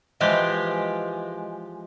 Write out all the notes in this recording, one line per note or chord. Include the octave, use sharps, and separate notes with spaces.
E3 F3 G#3 G4 F5